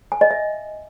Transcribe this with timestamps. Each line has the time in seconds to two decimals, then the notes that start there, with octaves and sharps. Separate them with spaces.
0.12 G#5
0.21 D#5
0.31 E5